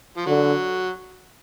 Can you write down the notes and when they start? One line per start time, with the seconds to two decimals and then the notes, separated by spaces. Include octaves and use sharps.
0.17 F3
0.26 D3 F#3